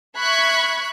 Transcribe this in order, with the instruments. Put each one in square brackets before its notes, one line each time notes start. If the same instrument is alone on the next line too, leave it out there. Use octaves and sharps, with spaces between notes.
[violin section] E5 B5 C#6 F#6 G#6